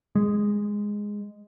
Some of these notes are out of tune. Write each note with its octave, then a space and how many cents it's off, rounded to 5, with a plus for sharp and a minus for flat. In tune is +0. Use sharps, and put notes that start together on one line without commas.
G#3 -5